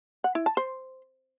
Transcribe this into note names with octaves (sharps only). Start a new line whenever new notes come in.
F#5
E4
A5
C5